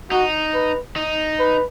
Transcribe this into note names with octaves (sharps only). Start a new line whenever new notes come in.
D#4 F#4
B4
D#4
B4